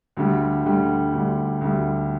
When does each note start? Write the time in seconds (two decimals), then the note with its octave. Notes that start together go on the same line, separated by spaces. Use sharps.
0.17 D2 D3 G3
0.65 D2 D3 G3
1.13 D2 D3 G3
1.61 D2 D3 G3